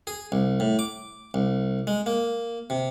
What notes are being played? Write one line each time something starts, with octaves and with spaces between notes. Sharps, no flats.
G#4
C2
A2
D6
C2
G#3
A#3
C3